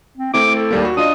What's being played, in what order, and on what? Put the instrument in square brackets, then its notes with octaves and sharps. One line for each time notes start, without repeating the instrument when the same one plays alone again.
[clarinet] C4
[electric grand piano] A3 C4 E4 [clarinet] D6
[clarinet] A4
[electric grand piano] D#2 G3 A#3
F#4
[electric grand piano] D4 F4 D#5 [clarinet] D#6